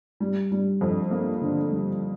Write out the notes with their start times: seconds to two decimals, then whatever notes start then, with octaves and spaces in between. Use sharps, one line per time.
0.20 G3
0.52 G3
0.81 F2
1.11 A#3
1.41 D3
1.71 G3